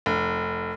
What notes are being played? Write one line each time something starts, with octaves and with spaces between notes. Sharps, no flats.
F1